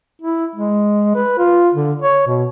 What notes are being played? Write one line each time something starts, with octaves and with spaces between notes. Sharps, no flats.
E4
G#3
B4
F4
D3
C#5
B2